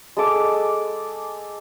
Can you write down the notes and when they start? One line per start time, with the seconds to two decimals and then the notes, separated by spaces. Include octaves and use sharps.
0.17 G#3 A4 D6